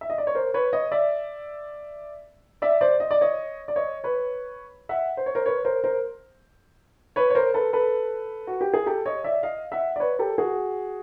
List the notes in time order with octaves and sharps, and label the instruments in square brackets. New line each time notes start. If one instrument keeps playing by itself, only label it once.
[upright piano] E5
D#5
D5
C#5
A#4 C5
B4 C#5
C#5 D#5
D5 E5
D5 E5
C5 D5
D#5
D5
C#5 D#5
D5
C#5 D#5
B4 C#5
E5 F#5
C5
C#5
A#4 C5
B4 C#5
A#4 C5
A#4 C5
B4 C#5
C#5
A#4 C5
A4 B4
A4 B4
F#4
G4
G#4
G4 A4
C#5 D#5
D5 E5
D#5 F5
E5 F#5
D5
B4 C#5
G4 A4
F#4 G#4